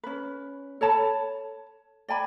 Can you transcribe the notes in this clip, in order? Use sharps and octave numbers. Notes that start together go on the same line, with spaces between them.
C#4 B4
A4 C#5 A5 B5
D5 G5 G#5 B5